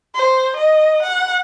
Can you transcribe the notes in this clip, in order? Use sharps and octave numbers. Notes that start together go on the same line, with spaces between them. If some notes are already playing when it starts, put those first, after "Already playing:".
C5
D#5
F#5